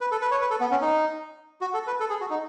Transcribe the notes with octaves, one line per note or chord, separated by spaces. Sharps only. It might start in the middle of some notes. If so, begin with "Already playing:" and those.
B4
A4
B4
C#5
B4
A4
B3
C#4
D#4
F#4
A4
B4
A4
G#4
F#4
D#4